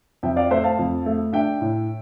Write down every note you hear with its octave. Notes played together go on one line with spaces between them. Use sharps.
F2 E5 G5
D5 F5
A3 C5 E5
F5 A5
F2
A3
D4 E5 G5
A2